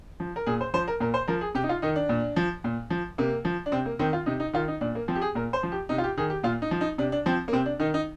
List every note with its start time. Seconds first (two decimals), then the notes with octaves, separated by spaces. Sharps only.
0.20 F3
0.36 A#4
0.46 A#2 G#4
0.61 C5
0.74 F3 C5
0.88 A#4
1.00 A#2 A#4
1.14 C5
1.28 F3 A#4
1.41 G#4
1.55 C3 G4
1.64 D#4
1.69 F4
1.82 D#3 D#4
1.96 D4
2.09 A#2
2.36 F3
2.64 A#2
2.90 F3
3.18 C3 A#3
3.45 F3
3.66 D4
3.72 C3 C4
3.86 A#3
3.99 D#3 C4
4.13 F4
4.26 C3 D#4
4.40 D#4
4.53 D#3 F4
4.68 D#4
4.81 A#2 D4
4.95 A#3
5.08 F3 C4
5.15 G4
5.21 G#4
5.35 A#2 A#4
5.53 C5
5.63 F3
5.72 G4
5.89 C3 D#4
5.98 F4
6.04 G4
6.17 D#3 G#4
6.30 G4
6.43 A#2 F4
6.62 D#4
6.71 F3
6.81 D#4
6.98 C3 D4
7.12 D4
7.26 F3 C4
7.48 A#3
7.53 C3 C4
7.66 D4
7.79 D#3 D#4
7.94 D#4